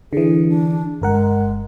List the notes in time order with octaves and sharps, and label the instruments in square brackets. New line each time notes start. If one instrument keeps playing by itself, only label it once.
[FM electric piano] D3 E3 [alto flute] G#4
[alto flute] D4
[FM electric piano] G1 A#4 F#5 [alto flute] G#3